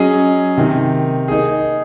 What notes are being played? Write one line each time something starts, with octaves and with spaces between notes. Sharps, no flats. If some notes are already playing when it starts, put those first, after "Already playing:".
Already playing: F#3 C#4 G#4 D#5
C3 D#3 A#3
A#3 D#4 G#4